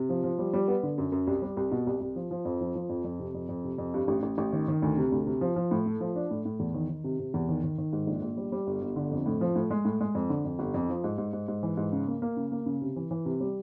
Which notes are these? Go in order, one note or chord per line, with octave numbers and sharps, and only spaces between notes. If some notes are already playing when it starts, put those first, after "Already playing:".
Already playing: C3
F3
F3
G3
G3
B3
D3
F#2
F#2
C2
G3
C2
B2
C2
C2
F3
F3
F2
F3
F3
F2
F2
C3
F2
F2
C3
F2
G2
A1
A1
A1
D#3
D#3
D2
C3
D2
C3
F3
F3
A2
A3
F3
D4
A2
A2
E2
D#3
D#3
C3
C3
E2
D#3
D#3
D#3
G#2
A#1
A#1
G3
G3
G1
G1
D3
F2
A2
F3
A2
G#3
A2
G#3
F2
D3
F2
G1
F2
F3
G#2
G#2
G#2
G#2
E3
G#2
C#3
A#3
A#3
C#3
A#3
C#3
C3
E3
E3
C3
G3